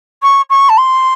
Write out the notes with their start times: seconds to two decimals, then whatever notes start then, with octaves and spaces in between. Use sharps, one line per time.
0.22 C#6
0.49 C#6
0.69 A5
0.77 C6